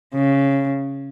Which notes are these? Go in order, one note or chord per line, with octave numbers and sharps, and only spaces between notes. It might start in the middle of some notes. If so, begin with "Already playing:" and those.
C#3